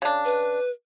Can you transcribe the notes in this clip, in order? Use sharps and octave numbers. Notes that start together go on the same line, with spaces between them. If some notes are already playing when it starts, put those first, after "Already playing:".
C#3 D4
B4